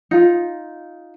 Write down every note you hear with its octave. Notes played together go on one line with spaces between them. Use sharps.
D#4 F4